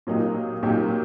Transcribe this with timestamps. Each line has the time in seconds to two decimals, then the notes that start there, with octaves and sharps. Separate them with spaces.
0.07 A#2 F#3 A#3 D#4 G4
0.63 A#2 F#3 A#3 D#4 G4